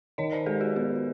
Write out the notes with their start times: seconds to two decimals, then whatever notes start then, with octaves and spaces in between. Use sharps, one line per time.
0.18 D#3 C#5 D#5
0.32 C5 D5
0.46 G#3 G4 A4
0.61 F#4 G#4
0.75 B3 F#4 G#4